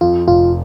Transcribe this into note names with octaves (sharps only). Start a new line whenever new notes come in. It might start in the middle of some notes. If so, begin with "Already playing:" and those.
F2 F4
F1 F4